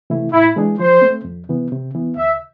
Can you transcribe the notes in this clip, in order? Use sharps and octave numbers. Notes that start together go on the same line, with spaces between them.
C3 E3 A3 E4
A2 E4
E3 G#3 D4 G#4
F3 C5
A3 C4
F2
C3 E3 B3
C3
E3 B3
D2 E5